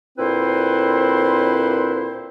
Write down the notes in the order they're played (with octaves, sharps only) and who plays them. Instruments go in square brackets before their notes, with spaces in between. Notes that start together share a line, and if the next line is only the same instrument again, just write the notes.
[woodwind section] D2 A#2 C4 E4 B4 C5